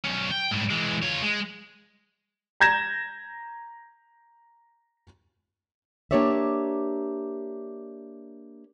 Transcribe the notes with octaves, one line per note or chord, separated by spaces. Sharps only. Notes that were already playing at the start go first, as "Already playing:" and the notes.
B1 C#4
G5
G#2 G3
E3 G#3
F4 C#5
G#3
A#5 G6 G#6 A#6 E7
A#3 D4 G4 C#5 D5 E5